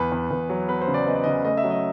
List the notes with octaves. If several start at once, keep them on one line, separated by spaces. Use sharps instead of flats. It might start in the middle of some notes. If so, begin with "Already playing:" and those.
Already playing: E2 B4
E2
E2
F#3
B3 B4
C5
C#3
D5
B3 D#5
D5
C#3 D#5
A3 D#5
E5
F#3
D#5